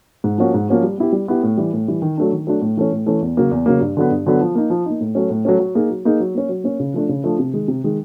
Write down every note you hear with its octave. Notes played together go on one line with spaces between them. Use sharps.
G#2
F3 A#3 C#4 F#4
G#2
F3 A#3 C#4 F#4
G3
B3 E4 G4
G3
B3 E4 G4
A2
E3 G3
A2
E3 G3
D#3
F#3 A3 D4
D#3
F#3 A3 D4
A2
E3 A3 C#4
A2
E3 A3 C#4
E2
C#3 F#3 A#3
E2
C#3 F#3 A#3
G2
D3 F#3 B3
G2
D3 F#3 B3
F3
A#3 D#4
F3
A#3 D#4
A2
F#3 A3 C#4
A2
F#3 A3 C#4
F#3
A#3 D#4 G#4
F#3
A#3 D#4 G#4
F#3
A#3 C#4
F#3
A#3 C#4
C#3
F3 A3 D4
C#3
F3 A3 D4
C3
D#3 G#3
C3
D#3 G#3